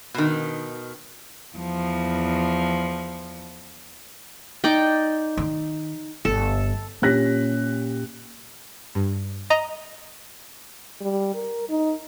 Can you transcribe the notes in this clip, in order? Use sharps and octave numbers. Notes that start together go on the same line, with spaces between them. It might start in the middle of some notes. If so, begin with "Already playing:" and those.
B2 D#3
E2 F3
D#4 D5 G5
D#3
G1 A4
A#2 C#4 G4 F#6 A#6 B6
G2
D#5 A#5
G3
A#4
D#4